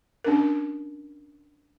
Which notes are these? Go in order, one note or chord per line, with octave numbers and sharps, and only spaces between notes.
C#4 D4 A#4